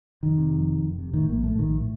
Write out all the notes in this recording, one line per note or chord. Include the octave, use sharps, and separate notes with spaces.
F1 D#3
C3
F2
F1
F1
C3
A2 D#3
A#1 A#3
A2 A3
A#1 D#3
A2